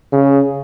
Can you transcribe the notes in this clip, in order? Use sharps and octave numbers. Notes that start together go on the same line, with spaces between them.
C#3